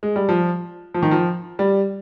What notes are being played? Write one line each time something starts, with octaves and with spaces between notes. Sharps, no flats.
G#3
G3
F3
F3
D#3
F3
G3